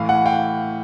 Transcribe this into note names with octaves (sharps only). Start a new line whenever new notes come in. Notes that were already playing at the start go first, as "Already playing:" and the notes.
Already playing: A2 E3 F5
F#5
F5 G5